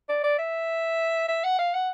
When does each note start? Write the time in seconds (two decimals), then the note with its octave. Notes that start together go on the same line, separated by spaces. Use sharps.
0.09 D5
0.24 D5
0.38 E5
1.28 E5
1.44 F#5
1.59 F5
1.74 F#5